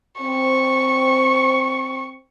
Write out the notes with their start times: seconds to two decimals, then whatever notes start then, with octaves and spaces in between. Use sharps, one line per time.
0.22 C4 C#6